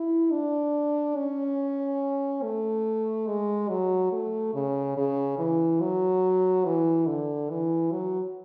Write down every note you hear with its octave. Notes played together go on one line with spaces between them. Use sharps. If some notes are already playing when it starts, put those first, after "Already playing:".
Already playing: E4
D4
C#4
A3
G#3
F#3
A3
C#3
C#3
E3
F#3
E3
D3
E3
F#3